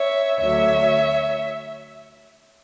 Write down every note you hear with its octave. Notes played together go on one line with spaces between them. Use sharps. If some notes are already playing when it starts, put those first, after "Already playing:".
Already playing: C#5 E5
D2 D3 F#3 C#5 E5